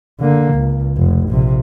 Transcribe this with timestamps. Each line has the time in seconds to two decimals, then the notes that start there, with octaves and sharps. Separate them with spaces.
0.20 D3 A#3
0.54 C#2
0.97 F1
1.30 A#1 C3